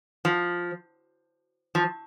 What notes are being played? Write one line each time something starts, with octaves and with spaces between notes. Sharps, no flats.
F3
F3